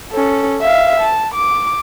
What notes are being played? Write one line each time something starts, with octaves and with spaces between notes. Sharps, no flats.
C#4 A4
E5 F5
A5
D6